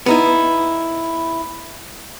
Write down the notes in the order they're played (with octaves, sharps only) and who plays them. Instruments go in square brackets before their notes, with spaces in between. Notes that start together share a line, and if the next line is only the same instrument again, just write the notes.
[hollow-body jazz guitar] B3 D#4 E4